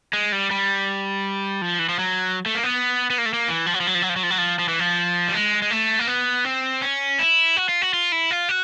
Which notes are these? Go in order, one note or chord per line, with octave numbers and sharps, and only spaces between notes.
G#3
G3
G3
F3
E3
F3
F#3
A3
A#3
B3
B3
A#3
A3
A#3
E3
F3
F#3
F3
F#3
F3
F#3
F3
F#3
F3
F#3
F3
F3
E3
F3
G3
G#3
G#3
A3
A#3
B3
C4
C#4
E4
F#4
F4
F#4
F4
E4
F4
F#4